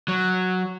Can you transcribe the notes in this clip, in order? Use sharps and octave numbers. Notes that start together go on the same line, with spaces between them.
F#3